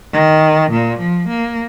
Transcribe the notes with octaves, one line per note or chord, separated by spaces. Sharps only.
D#3
A#2
F3
A#3